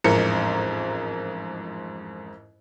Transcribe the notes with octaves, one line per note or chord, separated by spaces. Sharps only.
A1 F2 G#2 A#4 C5 C#7